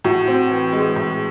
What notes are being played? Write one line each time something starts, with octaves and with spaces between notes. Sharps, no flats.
A2 F#4
C4
E3
G#3
A2